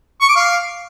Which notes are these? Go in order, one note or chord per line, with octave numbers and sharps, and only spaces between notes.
C#6
D6
F5